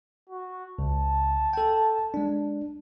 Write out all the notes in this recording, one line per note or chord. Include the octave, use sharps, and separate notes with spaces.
F#4
C#2 A5
A4 G5
G#3 D4